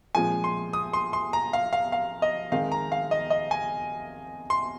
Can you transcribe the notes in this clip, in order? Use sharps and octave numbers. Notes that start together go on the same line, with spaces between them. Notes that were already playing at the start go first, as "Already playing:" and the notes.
A#2 F3 G#3 C4 G#5
C6
D#6
C6
C6
A#5
F5
F5
F5
D#5
D#3 G#3 C4 F5
A#5
F5
D#5
D#5
G#5
C6